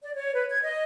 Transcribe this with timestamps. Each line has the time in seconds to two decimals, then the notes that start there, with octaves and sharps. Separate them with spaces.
0.03 D5
0.15 C#5
0.34 B4
0.50 G#6
0.63 D#5